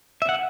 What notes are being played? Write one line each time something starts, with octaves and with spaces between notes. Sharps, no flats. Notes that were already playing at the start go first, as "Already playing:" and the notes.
E5
F#5